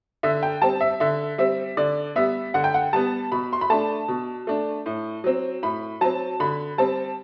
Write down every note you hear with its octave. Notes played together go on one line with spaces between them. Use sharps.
D3 E5
G5
G3 C4 A5
E5
D3 E5
G3 C4 E5
D3 D5
G3 B3 E5
D3 F#5
G5
F#5
G3 B3 A5
B2 B5
C6
B5
A3 D4 A5
B2
A3 D4
A2
F#3 C4
A2 B5
F#3 C4 A5
D3 B5
G3 C4 A5